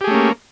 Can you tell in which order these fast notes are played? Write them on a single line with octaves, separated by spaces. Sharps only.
G4 G#4 A3 C#4 A#3